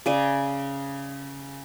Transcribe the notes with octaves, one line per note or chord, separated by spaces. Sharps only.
C#3 D5 G#5